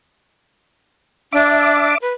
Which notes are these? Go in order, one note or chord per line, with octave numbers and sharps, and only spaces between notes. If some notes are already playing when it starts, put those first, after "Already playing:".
D4 E5 D6
B4